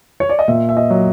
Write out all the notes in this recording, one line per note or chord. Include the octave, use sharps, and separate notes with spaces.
C#5
D5
D#5
A#2 E5
E5
D#5
F#3